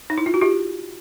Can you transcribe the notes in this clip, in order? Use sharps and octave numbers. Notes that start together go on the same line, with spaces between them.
D#4
E4
F4
F#4
F4 G4